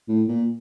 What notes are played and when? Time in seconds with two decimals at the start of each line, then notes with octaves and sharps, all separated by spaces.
0.08 A2
0.28 A#2